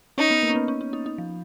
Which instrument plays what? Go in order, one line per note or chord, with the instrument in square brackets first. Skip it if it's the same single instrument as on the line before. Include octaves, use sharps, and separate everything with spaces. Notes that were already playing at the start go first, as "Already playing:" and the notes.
[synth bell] C#4 [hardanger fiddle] D#4
[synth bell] B3
A#3
C#4
B3
C#4
C#4
D#4
D#4
F3